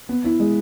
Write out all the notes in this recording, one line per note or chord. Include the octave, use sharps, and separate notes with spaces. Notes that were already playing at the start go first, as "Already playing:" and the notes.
B3
E4
G#3